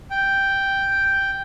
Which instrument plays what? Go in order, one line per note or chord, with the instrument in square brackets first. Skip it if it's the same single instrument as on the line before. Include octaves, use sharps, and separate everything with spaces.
[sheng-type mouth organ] G5